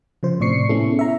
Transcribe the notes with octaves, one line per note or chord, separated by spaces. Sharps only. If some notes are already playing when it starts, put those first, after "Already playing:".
C#3 F3 C5
A2 C3 D5 C#6 C7 C#7
B3 C#4 E4 G#4 A4
E5 A#5